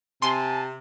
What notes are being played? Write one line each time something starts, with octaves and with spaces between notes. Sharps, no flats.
C3 G#5 A5 C6